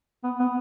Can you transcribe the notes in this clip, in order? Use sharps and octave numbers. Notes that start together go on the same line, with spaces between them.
B3
B3